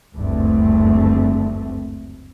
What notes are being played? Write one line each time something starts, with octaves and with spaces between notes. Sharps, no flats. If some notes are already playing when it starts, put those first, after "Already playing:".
F#1 D2 G2 A3 C4